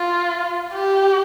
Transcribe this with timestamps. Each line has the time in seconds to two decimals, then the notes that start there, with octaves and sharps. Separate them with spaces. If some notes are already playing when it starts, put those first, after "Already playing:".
Already playing: F4
0.72 G4